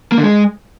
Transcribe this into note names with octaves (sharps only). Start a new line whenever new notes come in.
A#3
D3
G#3